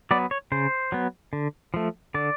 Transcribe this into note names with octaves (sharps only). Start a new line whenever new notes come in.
F#3 B3 D5
C#5
C#3 C5
F#3 B3
D3
F3 A3
D3 D5